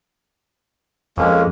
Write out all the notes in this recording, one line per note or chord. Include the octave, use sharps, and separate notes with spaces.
F2 G#3 A#3 C#4